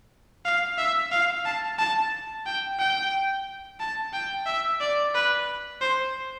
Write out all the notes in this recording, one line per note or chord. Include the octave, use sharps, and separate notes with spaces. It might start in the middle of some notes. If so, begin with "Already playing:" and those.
F5
E5
F5
A5
A5
G5
G5
A5
G5
E5
D5
B4
C5